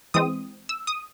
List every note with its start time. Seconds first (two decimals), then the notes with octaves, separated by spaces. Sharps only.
0.14 E3 G#3 C4 D#6
0.69 E6
0.87 D#6